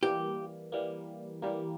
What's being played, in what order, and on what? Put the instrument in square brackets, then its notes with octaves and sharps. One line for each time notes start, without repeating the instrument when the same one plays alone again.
[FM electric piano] E3 G3 A#3 [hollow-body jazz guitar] G4
[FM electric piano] E3 G3 A#3
E3 G3 A#3